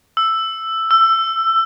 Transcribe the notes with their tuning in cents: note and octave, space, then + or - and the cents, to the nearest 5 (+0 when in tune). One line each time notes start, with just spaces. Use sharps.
E6 +5
E6 +20